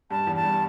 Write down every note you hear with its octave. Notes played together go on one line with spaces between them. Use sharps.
G2 A5
E2
A5
G2